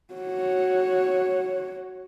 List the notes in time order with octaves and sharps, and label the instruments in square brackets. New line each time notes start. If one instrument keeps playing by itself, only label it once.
[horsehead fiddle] F#4 C#5